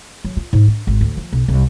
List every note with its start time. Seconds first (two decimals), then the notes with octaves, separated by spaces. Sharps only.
0.25 F#3
0.37 F4
0.53 G#2
0.68 D4
0.87 G#1
1.01 D2
1.17 F3
1.33 B1
1.48 C2